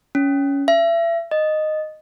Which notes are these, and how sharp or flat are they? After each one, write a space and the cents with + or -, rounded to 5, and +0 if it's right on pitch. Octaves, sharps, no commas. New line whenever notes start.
C#4 +10
E5 +35
D#5 -10